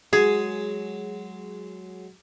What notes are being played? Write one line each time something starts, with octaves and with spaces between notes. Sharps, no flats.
F#3 G#3 G#4